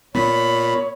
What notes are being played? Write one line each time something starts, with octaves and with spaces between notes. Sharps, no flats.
A#2 B3 C#5 B5